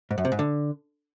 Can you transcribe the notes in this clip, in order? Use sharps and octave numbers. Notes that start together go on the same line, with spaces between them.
G#2
F#2
C3
G#2
D3